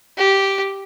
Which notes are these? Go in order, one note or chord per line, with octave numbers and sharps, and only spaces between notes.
G4